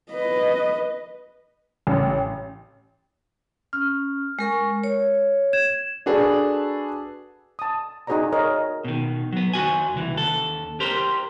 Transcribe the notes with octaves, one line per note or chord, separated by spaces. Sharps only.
B4 D#5
A1
C#4 F6
G#3 A#4 C#6
C#5
G#6 E7
D4 F#4 G#4 A4 B4
A5 D#6
D#4 F#4 G#4 C5 D5 A#5
G#4 A#4 C#5 D#5
B2 D#3
F#3 B3
D#2 F#4 G#5
C2 E3
D#2 A4
G4 A#4 C5